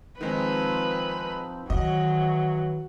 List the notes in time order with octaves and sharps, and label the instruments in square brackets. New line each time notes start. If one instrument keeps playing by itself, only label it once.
[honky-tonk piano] D#3 G#3 [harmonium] F3 C4 D#4 [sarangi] B4
[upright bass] D#3 [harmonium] E3 [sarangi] F#3 [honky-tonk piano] D#5